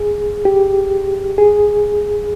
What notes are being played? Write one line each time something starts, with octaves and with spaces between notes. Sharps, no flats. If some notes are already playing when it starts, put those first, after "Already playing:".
Already playing: G#4
G4
G#4